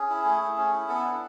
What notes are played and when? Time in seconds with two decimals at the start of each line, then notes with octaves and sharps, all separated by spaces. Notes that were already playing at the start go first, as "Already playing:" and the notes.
Already playing: C#4 G#4
0.10 E4
0.25 A3
0.41 A3
0.57 C#4
0.73 E4
0.89 B3 A4
1.05 D4